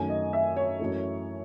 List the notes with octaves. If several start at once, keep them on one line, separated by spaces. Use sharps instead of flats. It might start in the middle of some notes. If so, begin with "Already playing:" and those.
Already playing: F#2 D#3 A3 G#5
D#5
E5
C#5
F#2 E3 A3